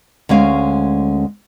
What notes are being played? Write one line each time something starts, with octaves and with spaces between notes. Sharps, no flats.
D2 G#3 C#4 F5